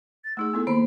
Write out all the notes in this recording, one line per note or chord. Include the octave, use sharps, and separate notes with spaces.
A6
A3 D#4 G#4 E6
B3 E4 A4
D#3 A#3 C5 B5